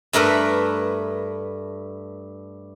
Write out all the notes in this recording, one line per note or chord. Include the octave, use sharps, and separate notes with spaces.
G2 A3 A#4 B4 E5